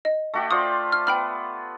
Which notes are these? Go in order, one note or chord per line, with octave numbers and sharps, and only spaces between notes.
D#5
A3 F#4 G4
F4 C5 D5 D#6
F6
B3 G5 B5 F6